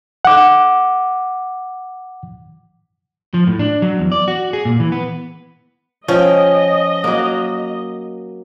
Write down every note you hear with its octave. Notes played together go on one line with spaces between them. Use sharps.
F#5 D6
F3
A2
D4
F#3
E2
D5
F#4
G#4
A#2
E3
B3
F3 C#4 D#5 G5
F#3 A#3